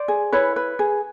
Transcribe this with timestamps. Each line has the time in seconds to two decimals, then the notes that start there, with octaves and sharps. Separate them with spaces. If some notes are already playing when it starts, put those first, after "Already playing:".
Already playing: C5 D5
0.08 G#4
0.32 E4 B4 C#5
0.56 B4
0.79 G#4